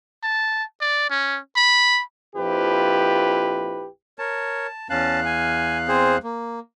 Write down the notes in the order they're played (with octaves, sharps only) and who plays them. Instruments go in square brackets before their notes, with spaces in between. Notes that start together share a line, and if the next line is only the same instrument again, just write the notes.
[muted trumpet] A5
D5
C#4
B5
[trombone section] A#1 F2 F3 E4 G4 B4
[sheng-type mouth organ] A#4 C#5 [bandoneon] A5
[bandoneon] E2 F5 F#6 [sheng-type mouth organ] C#4 A5
[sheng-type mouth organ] G#5
C4 G#4 C5
A#3